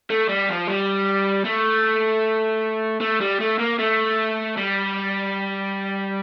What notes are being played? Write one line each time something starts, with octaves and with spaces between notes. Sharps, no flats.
A3
G3
F3
G3
A3
A3
G3
A3
A#3
A3
G3